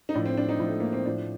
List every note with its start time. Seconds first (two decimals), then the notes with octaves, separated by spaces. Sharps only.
0.09 D#4
0.14 A2 F3 D4
0.25 C4
0.37 D4
0.49 D#4
0.60 A2 F3
0.68 A3
0.80 A#3
0.93 C4
1.05 A2 F3 D4